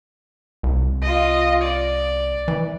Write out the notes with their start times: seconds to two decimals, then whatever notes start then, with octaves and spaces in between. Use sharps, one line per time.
0.63 C2
1.02 F4 D#5
1.62 D5
2.48 E3